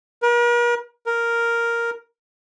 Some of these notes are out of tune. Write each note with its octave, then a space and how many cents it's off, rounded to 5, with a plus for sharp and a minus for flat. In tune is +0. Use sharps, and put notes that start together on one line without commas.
A#4 +45
A#4 +0